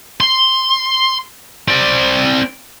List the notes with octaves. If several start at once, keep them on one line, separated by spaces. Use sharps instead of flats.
C6
C4 D5